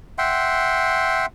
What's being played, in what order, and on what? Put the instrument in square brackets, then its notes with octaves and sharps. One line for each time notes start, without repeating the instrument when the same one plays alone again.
[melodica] E5 F#5 G5 C6